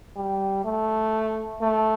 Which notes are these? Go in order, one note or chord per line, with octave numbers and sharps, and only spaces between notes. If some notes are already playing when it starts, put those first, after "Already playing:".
G3
A3
A3